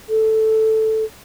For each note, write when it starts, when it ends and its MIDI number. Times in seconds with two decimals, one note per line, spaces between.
0.09 1.05 69